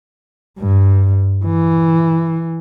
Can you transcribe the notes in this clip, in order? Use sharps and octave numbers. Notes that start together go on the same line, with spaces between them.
G2
E3